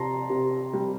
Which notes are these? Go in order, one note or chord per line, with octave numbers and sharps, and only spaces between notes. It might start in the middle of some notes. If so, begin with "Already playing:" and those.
Already playing: C3 A5 A#5 C6
C3
G3